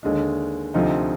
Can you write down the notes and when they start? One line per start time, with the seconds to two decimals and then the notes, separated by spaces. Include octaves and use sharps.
0.03 D#2 D3 G#3 D4
0.74 D2 C3 F3 C4 D#4